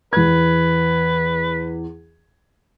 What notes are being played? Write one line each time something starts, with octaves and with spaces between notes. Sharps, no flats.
E2 B4 G#6